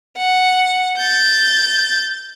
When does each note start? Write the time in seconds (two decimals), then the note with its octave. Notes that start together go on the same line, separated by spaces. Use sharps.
0.17 F#5
0.98 G6 A6